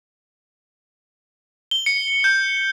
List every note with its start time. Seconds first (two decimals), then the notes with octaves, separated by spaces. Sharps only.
1.71 G7
1.86 C#7
2.24 G6